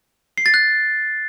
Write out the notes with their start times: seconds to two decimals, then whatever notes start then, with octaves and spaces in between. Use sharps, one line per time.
0.38 C7
0.46 A6
0.54 F#6